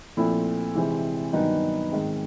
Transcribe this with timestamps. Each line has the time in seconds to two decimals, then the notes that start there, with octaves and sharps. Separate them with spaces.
0.17 A#2 F3 A3 C4 E4
0.75 C3 E3 G#3 C4
1.33 G2 D#3 F#3 B3 D#4
1.92 G#2 D#3 G#3 C4